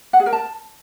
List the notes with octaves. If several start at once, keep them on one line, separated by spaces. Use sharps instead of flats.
F#5
G#4
A#4
A5